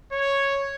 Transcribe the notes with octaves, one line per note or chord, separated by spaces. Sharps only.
C#5